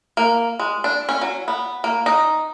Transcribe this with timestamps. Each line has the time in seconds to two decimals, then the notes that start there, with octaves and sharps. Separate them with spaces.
0.17 A#3
0.59 G#3
0.84 D4
1.09 C#4
1.21 F#3
1.48 B3
1.84 A#3
2.06 D#4